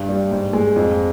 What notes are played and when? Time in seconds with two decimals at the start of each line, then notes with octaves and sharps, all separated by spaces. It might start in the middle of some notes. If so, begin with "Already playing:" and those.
Already playing: G2
0.09 G3
0.31 G#2
0.53 G#3
0.76 F2